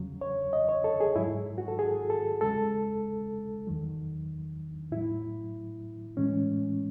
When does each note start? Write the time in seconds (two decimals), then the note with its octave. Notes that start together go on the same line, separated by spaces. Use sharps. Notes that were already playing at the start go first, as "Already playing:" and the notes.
Already playing: E2 C#3 F#3
0.21 C#5
0.53 D#5
0.69 C#5
0.84 A4
1.01 G#4
1.16 G#2 F#3 E4
1.58 F#4
1.68 A4
1.79 G#4
2.10 A4
2.41 E2 C#3 G#3 A4
3.67 E2 D#3 F#3
4.92 A2 F#3 E4
6.17 A2 E3 G#3 C#4